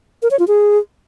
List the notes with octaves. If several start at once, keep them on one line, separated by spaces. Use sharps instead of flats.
A#4
C#5
F4
G#4